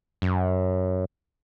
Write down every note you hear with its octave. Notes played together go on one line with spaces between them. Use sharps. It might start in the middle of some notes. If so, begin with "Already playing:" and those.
F#2